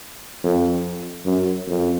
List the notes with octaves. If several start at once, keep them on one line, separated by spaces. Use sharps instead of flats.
F2
F#2
F2